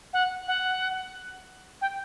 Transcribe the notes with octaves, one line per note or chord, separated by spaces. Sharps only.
F#5
F#5
G5